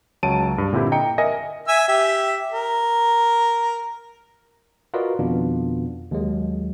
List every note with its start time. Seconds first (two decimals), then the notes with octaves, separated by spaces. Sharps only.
0.23 C#2 F#3 C#5 A5 D7 D#7
0.58 G2
0.73 A#2 D3 C4 E4 G4
0.92 D#5 G5 A#5 C#7
1.18 A#4 D#5 E5 G#5 A#6
1.68 E5 G#5 E6
1.88 G4 E5
2.52 A#4
4.94 F4 F#4 A#4 B4 D5 D#5
5.19 F2 B2 D#3 B3 D4 F4
6.11 D#2 F#3 G#3